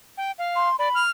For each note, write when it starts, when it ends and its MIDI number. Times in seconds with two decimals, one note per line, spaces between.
0.17 0.31 79
0.39 0.68 77
0.56 0.76 84
0.79 0.89 74
0.79 1.02 83
0.95 1.10 89